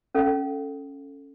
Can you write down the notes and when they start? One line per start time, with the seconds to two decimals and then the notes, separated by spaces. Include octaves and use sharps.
0.15 C#4 A4 F5